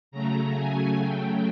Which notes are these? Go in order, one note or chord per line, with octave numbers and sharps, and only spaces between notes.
C#3 F#3 A3 A#5
G#5
G5